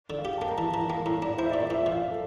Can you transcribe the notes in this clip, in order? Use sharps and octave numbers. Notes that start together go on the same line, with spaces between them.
D3
F5
G4
A5
A#3 G5
A#5
E3 A5
E3 A#5
A#3 A#5
A2 A#5
D4 A#5
E4 C5
E5
D5
A#2
D5
A#2 E5
F3 F5
A4